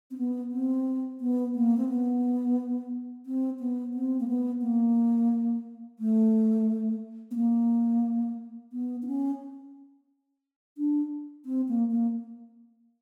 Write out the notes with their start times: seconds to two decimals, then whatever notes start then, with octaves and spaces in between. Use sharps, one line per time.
0.11 C4
0.18 B3
0.52 C4
1.21 B3
1.55 A#3
1.77 C4
1.89 B3
3.26 C4
3.60 B3
3.94 C4
4.20 A#3
4.28 B3
4.62 A#3
5.99 A3
7.31 B3
7.35 A#3
8.72 B3
9.02 D4
9.07 C#4
10.78 D4
11.45 C4
11.68 A#3
11.91 A#3